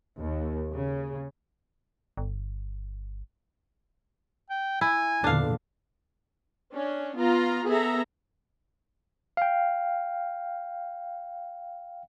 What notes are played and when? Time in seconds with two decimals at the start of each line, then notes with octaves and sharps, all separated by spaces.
0.18 D#2
0.73 C#3
2.17 G1
4.50 G5
4.81 E4 G#5
5.24 E2 A#2 D3 D4 F5
6.74 C#4 D4
7.18 B3 F4 A#5
7.68 B3 G#4 A4 E5 A#5
9.37 F5 G5